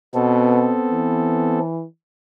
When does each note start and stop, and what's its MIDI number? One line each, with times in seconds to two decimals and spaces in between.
0.14 0.74 47
0.14 1.59 59
0.14 1.59 60
0.14 1.59 69
0.92 1.85 52